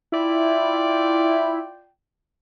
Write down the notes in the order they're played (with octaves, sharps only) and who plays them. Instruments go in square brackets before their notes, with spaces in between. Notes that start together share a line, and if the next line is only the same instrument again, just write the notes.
[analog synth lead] E4 [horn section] F4 D5 G5